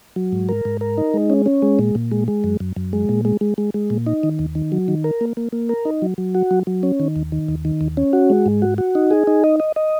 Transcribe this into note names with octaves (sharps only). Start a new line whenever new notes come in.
F#3
G#2
A#4
G#2
A#4
D#4
G#3
C#4
C#4
G#3
A#2
A#2
G#3
G#3
F#2
F#2
F#2
G#3
A#2
G#3
G#3
G#3
G#3
A#2
D#4
D#3
D#2
D#3
F#3
D#3
A#4
A#3
A#3
A#3
A#4
D#4
F#3
F#3
F#4
F#3
F#3
C#4
D#3
D#2
D#3
D#2
D#3
D#2
C#4
F#4
G#3
G#2
F#4
F#4
D#4
G#4
D#4
D#5
D#5
D#5